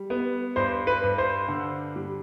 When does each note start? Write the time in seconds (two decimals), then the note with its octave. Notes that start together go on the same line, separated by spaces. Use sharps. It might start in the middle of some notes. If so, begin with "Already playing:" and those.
Already playing: G3
0.10 B3
0.56 G2 C5
0.87 B4
1.03 G2
1.18 C5
1.48 D3
1.96 G3